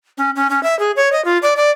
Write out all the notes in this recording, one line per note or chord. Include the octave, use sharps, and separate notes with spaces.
C#4
C#4
C#4
E5
G#4
C#5
D#5
F4
D5
D5